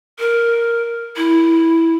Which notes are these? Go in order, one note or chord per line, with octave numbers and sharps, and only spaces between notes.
A#4
E4